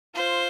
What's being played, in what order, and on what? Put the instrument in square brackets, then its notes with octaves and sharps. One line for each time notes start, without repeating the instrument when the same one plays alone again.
[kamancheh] F4 [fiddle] C5